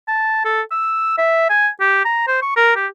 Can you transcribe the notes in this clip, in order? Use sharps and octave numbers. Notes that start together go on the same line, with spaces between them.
A5
A4
E6
E5
G#5
G4
A#5
C5
C#6
A#4
G4